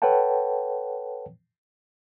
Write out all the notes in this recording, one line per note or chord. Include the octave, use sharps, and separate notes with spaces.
A4 B4 C#5 F#5 G5 A5